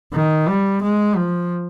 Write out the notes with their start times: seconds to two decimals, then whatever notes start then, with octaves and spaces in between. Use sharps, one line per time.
0.13 D#3
0.48 G3
0.82 G#3
1.16 F3